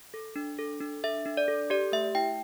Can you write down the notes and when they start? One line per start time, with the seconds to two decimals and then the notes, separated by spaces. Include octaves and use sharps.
0.14 A4
0.36 D4
0.59 A4
0.81 D4
1.04 A4 E5
1.26 D4
1.37 D5
1.48 A4
1.70 G4 D5
1.92 A3 E5
2.15 E4 G5